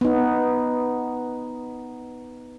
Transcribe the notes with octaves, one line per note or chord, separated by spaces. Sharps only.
B3 D#4